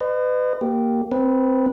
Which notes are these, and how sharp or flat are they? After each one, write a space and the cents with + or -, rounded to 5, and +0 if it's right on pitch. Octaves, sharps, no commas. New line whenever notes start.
B4 +35 D#5 -35
A#3 +0 G4 -10
C4 +0 B4 -15